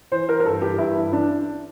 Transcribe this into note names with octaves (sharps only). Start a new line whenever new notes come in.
E3 C5
E3 A#4
A#4
G2 A4
E3 G4
G2 E4
E3
E3 D4